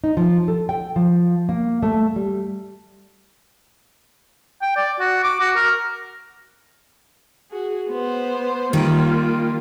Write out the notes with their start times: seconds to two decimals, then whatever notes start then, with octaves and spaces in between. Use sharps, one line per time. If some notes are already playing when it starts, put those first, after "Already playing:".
0.04 D#4
0.17 F3
0.48 A4
0.69 G5
0.96 F3
1.49 A#3
1.83 A3
2.16 G3
4.62 G5
4.76 D5
5.00 F#4
5.24 D6
5.40 F#4
5.56 A#4
7.50 F#4 G#4
7.89 B3 C5
8.73 D#3 G3 A#3 F4 G4